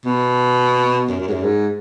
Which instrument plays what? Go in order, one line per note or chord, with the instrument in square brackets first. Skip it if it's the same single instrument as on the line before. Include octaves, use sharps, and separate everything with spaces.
[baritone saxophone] B2
F#2
F#2
G#2
F#2
G#2